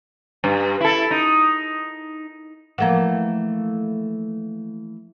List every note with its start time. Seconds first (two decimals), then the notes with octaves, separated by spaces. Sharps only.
0.44 G2
0.81 E4 A4
1.11 D#4
2.78 E3 F3 A3 A#3 F#5